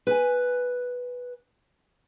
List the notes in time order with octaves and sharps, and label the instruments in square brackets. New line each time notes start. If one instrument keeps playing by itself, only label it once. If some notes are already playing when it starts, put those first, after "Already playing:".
[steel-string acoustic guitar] B4 G#5